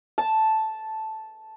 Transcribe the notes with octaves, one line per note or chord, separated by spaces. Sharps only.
A5